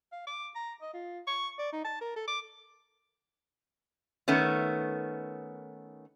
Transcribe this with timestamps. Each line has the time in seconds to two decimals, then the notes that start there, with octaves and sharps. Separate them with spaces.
0.12 F5
0.27 D6
0.55 A#5
0.81 D#5
0.94 F4
1.27 C#6
1.59 D5
1.73 D#4
1.85 A5
2.01 A#4
2.16 A4
2.28 D6
4.28 D#3 A3 B3 C#4